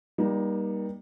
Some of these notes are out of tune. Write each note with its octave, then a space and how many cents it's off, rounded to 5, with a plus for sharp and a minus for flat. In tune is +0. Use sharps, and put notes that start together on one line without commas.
G3 +10 A#3 +35 D#4 +0